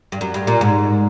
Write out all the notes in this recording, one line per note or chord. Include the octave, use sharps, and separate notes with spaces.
G2
F#2
G2
A#2
G#2